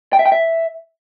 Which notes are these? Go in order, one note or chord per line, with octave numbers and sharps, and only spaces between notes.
G5
E5
G5
E5